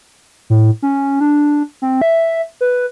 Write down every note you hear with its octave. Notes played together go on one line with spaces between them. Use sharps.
A2
C#4
D4
C4
E5
B4